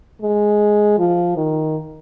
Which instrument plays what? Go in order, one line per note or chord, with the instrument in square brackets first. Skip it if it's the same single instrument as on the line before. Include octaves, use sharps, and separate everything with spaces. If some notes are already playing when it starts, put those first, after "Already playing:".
[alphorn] G#3
F3
D#3